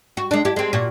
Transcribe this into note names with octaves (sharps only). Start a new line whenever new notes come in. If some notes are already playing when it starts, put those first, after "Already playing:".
F#4
G#3 D4
E4 G4
G#3 C4
A#2 F#4